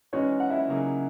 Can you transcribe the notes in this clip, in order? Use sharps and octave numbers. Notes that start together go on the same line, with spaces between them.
E3 G#3 C#4 D#4 F#4 C#5
F#5
E4 E5
C#3 F#3 A#3 D#4 G#4